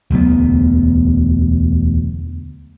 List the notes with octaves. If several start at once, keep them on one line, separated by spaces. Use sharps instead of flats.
E1 D2 F#3 B3